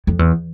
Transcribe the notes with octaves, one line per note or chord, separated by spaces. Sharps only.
F2
E2